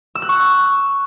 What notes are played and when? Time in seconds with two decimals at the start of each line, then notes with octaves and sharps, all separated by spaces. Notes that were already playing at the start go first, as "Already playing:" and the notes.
0.15 E6
0.22 F#6
0.29 C#6